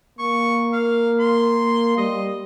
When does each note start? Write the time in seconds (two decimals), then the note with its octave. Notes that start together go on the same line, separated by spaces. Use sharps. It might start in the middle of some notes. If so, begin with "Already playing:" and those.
0.19 A#3 C#6
0.73 F5
1.20 C6
1.98 G3 D#5